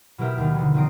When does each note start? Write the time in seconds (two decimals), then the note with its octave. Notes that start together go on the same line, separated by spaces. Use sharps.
0.18 B2 F#3 E4 G4 A#4 E5
0.38 D#2 D#3
0.55 D3 E3
0.74 F1 D#3 C4 D#4 D#5 D7